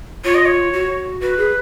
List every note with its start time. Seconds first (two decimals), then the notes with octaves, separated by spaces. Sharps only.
0.24 F4 C#5
0.35 D#5
0.46 C#5
0.73 F#4
1.21 F#4 B4
1.38 G#4